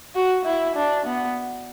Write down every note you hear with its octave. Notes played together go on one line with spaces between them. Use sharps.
F#4
E4
D4
B3